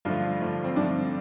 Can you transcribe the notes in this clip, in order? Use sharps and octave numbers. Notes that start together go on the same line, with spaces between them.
G2 D3 F3 A3 F4
G2 D3 F3 A3
C4
G2 D3 F3 A3 D4